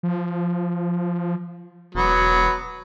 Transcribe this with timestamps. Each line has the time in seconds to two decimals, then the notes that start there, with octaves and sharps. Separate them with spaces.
0.03 F3
1.95 E1 F#3 B3